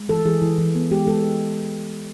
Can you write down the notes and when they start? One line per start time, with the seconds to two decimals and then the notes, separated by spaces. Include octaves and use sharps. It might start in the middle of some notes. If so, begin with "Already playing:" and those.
Already playing: G#3
0.09 E3 A4
0.25 E3 G#4
0.41 E3
0.58 E3
0.75 B3
0.91 G#3 G4
1.07 G#3 A4